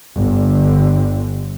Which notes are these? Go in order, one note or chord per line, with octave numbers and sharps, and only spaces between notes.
G1 D3